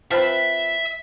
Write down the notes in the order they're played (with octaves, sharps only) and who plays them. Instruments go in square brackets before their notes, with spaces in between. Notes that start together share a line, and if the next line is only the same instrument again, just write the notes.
[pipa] F3 C4 B4 [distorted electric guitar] E5